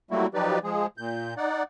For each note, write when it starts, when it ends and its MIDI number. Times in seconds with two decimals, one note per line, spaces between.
0.11 0.27 54
0.11 0.27 55
0.11 0.27 57
0.11 0.27 58
0.11 0.27 64
0.11 0.27 66
0.34 0.59 53
0.34 0.59 54
0.34 0.59 63
0.34 0.59 67
0.34 0.59 71
0.34 0.59 74
0.64 0.87 53
0.64 0.87 56
0.64 0.87 68
0.98 1.34 46
0.98 1.34 91
1.37 1.63 63
1.37 1.63 74
1.37 1.63 78